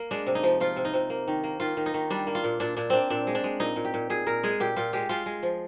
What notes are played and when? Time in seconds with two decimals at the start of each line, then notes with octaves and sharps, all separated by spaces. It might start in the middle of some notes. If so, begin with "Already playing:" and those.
Already playing: A#3
0.11 G#3 D4
0.27 C3
0.35 D#4
0.43 F3
0.60 F3 F4
0.77 C3
0.85 D#4
0.94 C3
1.10 A#3
1.28 D#3
1.44 A#3
1.60 D#3 F4
1.77 D#3
1.86 D#4
1.94 D#3
2.10 G3 D4
2.27 A#3
2.35 F4
2.44 A#2
2.60 A#2 D4
2.76 A#2 D4
2.90 A#3 C4 D4
3.10 A#2 D4
3.27 G#3
3.35 D4
3.44 G#3
3.60 A#2 D#4
3.76 A#2
3.85 G4
3.94 A#2
4.10 A#2 G#4
4.27 A#2 A#4
4.44 G#3 G#4
4.60 A#2 G4
4.77 A#2 F4
4.93 G#3 G4
5.09 G#3 F4
5.26 G#3
5.43 F3